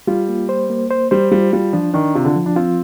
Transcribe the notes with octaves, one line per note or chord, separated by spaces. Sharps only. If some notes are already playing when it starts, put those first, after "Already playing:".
G3 F4
A#3
C5
A#3
C5
G3 C5
G3 F4
G3 F4
F3 D4
D#3 D4
C3 F4
D3
F3
D4
C4 F4